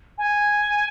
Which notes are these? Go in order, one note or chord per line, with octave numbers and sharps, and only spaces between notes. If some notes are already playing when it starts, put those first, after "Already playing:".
G#5